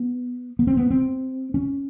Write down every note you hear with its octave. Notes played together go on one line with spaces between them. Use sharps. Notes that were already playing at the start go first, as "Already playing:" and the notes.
Already playing: B3
B3
C4
B3
C4
C#4